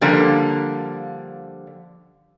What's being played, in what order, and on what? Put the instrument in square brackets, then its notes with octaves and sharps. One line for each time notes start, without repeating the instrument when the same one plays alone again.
[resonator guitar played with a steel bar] D3 F3 G3 A#3